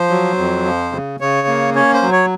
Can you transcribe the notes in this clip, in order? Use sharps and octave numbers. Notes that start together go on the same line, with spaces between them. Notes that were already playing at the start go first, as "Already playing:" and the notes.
Already playing: F3 C5
F#3
F2
F3
C#3
C#3 C#5
A#3
C#4 C#5
C5
F#3
C#5